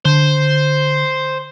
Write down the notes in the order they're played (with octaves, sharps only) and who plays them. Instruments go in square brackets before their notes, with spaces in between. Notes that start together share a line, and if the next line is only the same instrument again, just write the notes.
[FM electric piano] D3 [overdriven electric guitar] C5